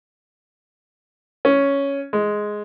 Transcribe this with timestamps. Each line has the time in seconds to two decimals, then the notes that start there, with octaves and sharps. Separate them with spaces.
1.45 C#4
2.13 G#3